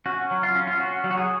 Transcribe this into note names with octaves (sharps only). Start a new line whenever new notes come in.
C#4 F#4
F#3
F4
C#4
F4
C#4 F#4
F#3
F#4
G#4